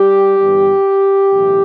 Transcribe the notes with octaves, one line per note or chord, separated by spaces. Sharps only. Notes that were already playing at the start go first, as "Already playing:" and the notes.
Already playing: G3 G4
G1 G2 E3 G3
B1 A2 E3